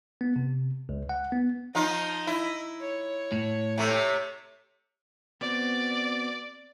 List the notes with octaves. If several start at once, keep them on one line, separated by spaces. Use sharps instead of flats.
B3
C3
C#2
F#5
B3
F3 D#4 F4 D#5
E4
C#5
A2
C3 A3 C#5
B3 C4 F#4 D5